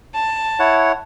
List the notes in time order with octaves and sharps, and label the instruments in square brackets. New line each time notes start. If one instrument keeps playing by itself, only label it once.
[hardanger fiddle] A5
[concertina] E4 C#5 F#5